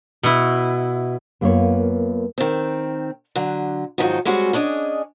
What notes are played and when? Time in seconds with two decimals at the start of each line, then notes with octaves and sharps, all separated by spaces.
0.23 B2 E4
1.41 F#2 A#3 B3 D4 F4 C#5
2.38 D#3 C4
3.36 D3 F#3
3.98 G#2 D#3 F3 F#3 D#4 F#4
4.25 G3 G#3 C4 C#4 F#4
4.53 C#4 D4 G#4 D#5